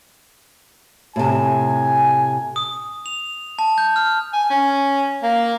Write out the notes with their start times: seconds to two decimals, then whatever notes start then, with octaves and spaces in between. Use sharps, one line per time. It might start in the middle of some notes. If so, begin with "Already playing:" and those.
1.16 A2 C3 G#5
2.56 D#6
3.06 F7
3.59 A5
3.78 G6
3.96 F6
4.33 G#5
4.50 C#4
5.23 A#3